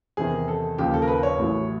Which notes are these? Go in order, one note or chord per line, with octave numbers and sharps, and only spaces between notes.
E2 C3 D#3 G#4
A4
D#2 C#3 F3 G4
A4
A#4
B4
C#5
A1 A2 F#3